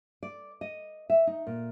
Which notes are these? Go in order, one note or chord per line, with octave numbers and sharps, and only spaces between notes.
D5
D#5
E5
D#4
A#2